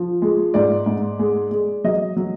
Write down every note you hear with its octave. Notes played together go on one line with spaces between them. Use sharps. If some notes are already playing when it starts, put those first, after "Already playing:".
Already playing: F3
G#3
G#2 D5
G#2
G#3
G#3
F#3 D#5
F#3